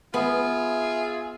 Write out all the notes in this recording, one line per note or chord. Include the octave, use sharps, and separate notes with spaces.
B3 F4 G#4 E5